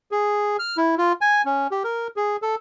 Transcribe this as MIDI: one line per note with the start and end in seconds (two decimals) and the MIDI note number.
0.11 0.57 68
0.59 0.77 89
0.77 0.95 64
0.98 1.13 65
1.21 1.42 80
1.45 1.67 61
1.71 1.83 67
1.84 2.08 70
2.16 2.37 68
2.42 2.55 69